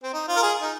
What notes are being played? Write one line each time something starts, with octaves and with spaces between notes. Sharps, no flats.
C4
D#4
F4
A#4
G#4
D#4